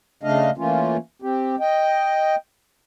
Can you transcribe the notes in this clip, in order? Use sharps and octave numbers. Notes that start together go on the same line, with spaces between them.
C#3 A3 D4 D#5 F5
E3 A3 A#3 C#4 F4
C4 G4
D#5 G5